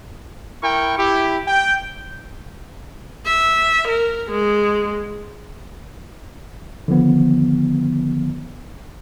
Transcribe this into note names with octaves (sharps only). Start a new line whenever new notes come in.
E4 A#4 G5 C#6
E4 G4
G5
E5
A#4
G#3
D3 D#3 F3 B3